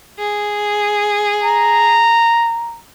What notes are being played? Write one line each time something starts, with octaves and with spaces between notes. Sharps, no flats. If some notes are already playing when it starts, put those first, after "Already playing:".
G#4
A#5